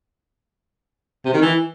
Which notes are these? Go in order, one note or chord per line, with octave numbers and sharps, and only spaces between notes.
C3
D#3
E3